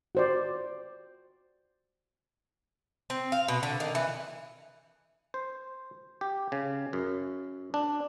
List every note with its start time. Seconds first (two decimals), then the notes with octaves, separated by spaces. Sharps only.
0.15 F#4 C5 D5
3.10 C4
3.32 F5
3.48 B2
3.63 D3
3.80 D#3
3.95 E3
5.34 C5
6.21 G4
6.52 C#3
6.93 F#2
7.74 D4